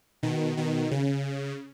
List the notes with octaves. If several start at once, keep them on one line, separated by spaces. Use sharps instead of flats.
B2 D#3
B2 D#3
C#3